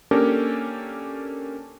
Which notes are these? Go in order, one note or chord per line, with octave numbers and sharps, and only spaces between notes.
A#3 C#4 D4 G4 A4 A#4